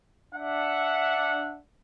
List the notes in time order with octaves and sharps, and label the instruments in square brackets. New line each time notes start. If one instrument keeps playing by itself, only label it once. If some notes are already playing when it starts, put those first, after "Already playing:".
[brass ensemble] D4 E5 F#5